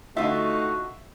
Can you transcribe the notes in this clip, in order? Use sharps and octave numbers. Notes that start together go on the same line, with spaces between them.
D3 A3 D#4 F4 F#4 E5